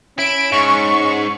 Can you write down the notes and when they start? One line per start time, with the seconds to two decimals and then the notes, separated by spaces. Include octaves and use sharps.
0.19 C#4 E4 D7
0.52 G#2 C#6